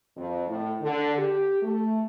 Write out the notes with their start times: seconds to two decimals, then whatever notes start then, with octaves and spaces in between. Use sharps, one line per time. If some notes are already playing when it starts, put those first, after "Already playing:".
0.17 F2
0.48 A2
0.82 D3
1.18 G4
1.63 A3